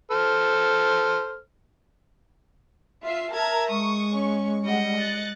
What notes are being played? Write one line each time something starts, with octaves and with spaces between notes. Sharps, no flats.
A4 C5 F6
F4 E5 C7
A#4 E5 A5 A#5 G#6
G#3 C#6 D#6
C#4
G3 D#5 F#5 C#7
F#6 A6